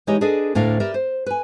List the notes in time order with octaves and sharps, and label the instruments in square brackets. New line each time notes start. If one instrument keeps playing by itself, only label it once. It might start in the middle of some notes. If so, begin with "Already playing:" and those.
[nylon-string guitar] E3 G#3 D#4 G4 C#5 D#5
D4 G#4 A4 B4 D5 D#5
D2 A2 D4 A#4 F5
G4 A#4 B4 D5 E5
C5
B4 G#5